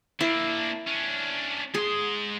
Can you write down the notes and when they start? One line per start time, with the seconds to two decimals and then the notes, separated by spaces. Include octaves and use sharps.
0.21 A#3 D4 E4
0.87 C#4 D4
1.74 G#2 G#4 C6